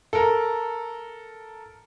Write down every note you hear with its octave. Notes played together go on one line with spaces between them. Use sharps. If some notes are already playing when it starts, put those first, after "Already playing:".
A4 A#4